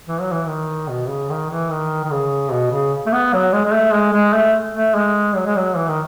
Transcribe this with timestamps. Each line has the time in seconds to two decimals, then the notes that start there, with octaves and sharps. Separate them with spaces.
0.08 E3
0.21 F#3
0.32 E3
0.48 D#3
0.89 B2
1.09 C#3
1.30 D#3
1.50 E3
1.70 D#3
2.04 D#3
2.11 C#3
2.52 B2
2.72 C#3
3.07 A3
3.12 B3
3.33 F#3
3.53 G#3
3.66 G#3
3.74 A3
3.94 G#3
4.14 G#3
4.34 A3
4.75 A3
4.95 G#3
5.36 F#3
5.46 G#3
5.56 F#3
5.76 E3
5.89 D#3